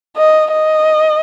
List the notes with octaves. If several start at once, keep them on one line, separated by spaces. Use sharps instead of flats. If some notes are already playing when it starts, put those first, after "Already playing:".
D#5
D#5